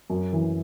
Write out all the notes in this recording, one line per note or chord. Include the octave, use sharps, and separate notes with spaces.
F#2
E3